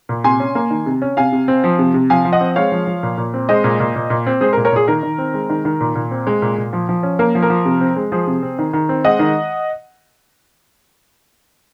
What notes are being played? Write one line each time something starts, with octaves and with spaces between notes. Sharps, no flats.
A#2
C3 G#5 C6
C#4
A#3
D#3
C3
C#4
C3 F5 G#5
C3
C4
F3
C3
C3
F3 F5 G#5
F3
D#5 F#5
C4
G#3 C#5 F5
F3
F3
A#2
A#2
C4
G#3 C5 D#5
A#2
A#2
A#2
A#2
C4
G#3 G#4 C5
A#4
A#2
A#4 C#5
A#2 G#4
D#3 A#4
D#3
C4
G#3
D#3
D#3
A#2
A#2
C4
G#3
A#2
A#2
F3
F3
C#4
A#3 A#4
F3
A#4
F3
C3
C4
G#3
F3 G#4 C5
C3
C4
D#3
D#3
C4
G#3 D#5 F#5
D#3